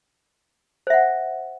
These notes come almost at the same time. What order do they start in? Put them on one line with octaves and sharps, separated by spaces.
C5 E5 F#5